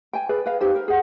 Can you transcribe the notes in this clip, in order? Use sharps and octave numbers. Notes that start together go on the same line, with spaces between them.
G5 G#5
G#4 B4 D5
B4 F5
D#4 G4 C5
A#4
G#4 F#5